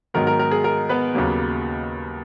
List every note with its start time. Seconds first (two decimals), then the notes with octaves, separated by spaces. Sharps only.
0.14 G#2 D#3 F#3 B3 A#4
0.27 A#4
0.39 A#4
0.51 G#4
0.64 A#4
0.89 B3 B4
1.15 D#2 C#3 F#3 A#3